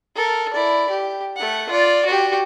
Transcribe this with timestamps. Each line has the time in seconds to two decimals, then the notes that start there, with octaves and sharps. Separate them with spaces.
0.16 A4 A#4
0.53 E4 D5
0.90 G4
1.36 A3 F#5
1.69 F4 D5
2.06 F#4 G4